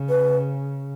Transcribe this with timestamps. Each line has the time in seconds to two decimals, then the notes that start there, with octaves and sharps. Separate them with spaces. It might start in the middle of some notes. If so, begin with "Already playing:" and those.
Already playing: C#3
0.09 B4